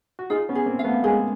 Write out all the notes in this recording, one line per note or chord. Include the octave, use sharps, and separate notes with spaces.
F#4
D#4 F4 G#4
B3 C#4
G#4
A#3 C4
F5
A3 B3
G#3 A#3 G#4